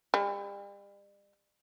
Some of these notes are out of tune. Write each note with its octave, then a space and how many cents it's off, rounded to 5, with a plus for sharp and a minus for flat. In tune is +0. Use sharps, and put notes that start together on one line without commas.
G3 +40